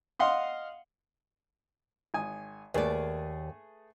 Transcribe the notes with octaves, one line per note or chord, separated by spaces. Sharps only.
D#5 F5 F#5 C6 D#6
G#1 G#5 D#6
D#2 A3 G#4 B4 D5